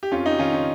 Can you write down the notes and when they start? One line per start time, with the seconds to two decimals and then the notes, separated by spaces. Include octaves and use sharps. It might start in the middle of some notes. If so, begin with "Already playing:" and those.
0.03 G4
0.11 F2 C#4 F4
0.26 D#4 G4
0.39 D#3 C#4 F4
0.53 C#4